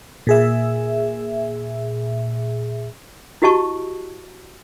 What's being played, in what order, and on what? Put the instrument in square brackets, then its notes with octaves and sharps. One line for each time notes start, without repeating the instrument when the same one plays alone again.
[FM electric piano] A#2 G#4 E5
[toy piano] E4 F#4 G4 D#5 A5 C#6